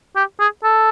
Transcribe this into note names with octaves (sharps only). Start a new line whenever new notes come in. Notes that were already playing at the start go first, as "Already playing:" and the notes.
G4
G#4
A4